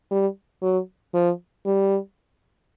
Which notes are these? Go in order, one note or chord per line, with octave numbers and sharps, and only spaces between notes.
G3
F#3
F3
G3